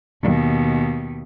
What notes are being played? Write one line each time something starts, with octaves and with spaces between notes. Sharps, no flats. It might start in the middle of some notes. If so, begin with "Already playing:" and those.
D#2 B2